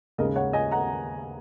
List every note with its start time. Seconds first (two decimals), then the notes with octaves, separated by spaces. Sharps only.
0.18 D#2 C#3 G#3 A#4 D#5
0.36 C#5 F#5
0.53 D#5 G#5
0.71 F#5 A#5